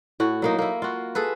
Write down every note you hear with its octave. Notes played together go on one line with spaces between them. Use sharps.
A2 F#4
F#3 A#3 D#4
A#3 E4
F4 F#4
G#4 A4 B4